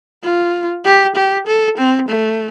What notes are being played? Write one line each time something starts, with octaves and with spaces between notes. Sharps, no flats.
F4
G4
G4
A4
C4
A3